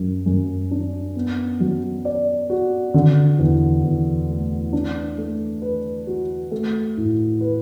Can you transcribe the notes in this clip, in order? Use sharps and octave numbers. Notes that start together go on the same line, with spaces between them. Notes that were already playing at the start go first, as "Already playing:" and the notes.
Already playing: F#2 F#3
F#2
D4
B3
F#3
D5
F#4
D3
E2
E2
A3
D4
A3
B4
F#4
A3
A2
B4